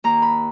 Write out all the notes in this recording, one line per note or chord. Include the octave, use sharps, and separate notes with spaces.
D#2 A#5
B5